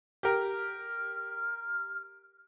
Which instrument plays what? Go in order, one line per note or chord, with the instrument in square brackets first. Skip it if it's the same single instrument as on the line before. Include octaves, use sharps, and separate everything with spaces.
[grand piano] G4 A#4 [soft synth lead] F6